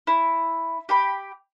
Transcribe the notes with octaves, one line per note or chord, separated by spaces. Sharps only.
E4
G4 G5 B5